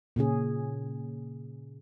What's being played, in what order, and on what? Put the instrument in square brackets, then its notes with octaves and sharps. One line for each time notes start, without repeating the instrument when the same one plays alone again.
[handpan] A#2 C#3 C#4 G#4